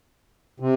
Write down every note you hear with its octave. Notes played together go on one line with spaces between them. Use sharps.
C3